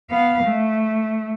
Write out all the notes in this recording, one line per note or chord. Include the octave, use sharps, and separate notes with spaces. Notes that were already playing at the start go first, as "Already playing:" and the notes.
B3 F5
A3